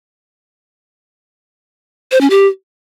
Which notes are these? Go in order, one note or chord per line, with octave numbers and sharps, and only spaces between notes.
C5
C#4
G4